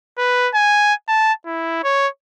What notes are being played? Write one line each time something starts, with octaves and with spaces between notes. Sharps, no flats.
B4
G#5
A5
E4
C#5